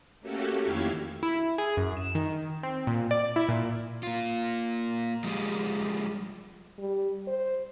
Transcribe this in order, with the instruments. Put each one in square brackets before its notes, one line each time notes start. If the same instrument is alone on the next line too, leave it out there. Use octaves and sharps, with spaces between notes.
[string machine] A3 A#3 C#4 F#4 G4 A4
F2 D#3 E4 G4 F5 G#6
[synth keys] E4
G#4
F#2
E7
D#3
C4
A#2
D5
E4
A#2
[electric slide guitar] A#3 F4
F3 G3 G#3
[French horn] G3
C5